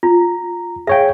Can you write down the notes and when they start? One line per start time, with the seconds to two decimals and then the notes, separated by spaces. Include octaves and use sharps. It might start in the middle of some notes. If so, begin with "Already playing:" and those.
0.03 F4 A#5
0.87 G#4 C#5 E5 F5 G5